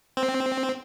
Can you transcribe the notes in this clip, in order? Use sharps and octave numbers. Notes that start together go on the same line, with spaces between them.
C4